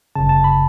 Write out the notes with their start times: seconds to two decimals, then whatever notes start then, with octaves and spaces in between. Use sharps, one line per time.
0.15 G1 F#2 C#3 A5
0.29 A5
0.44 B5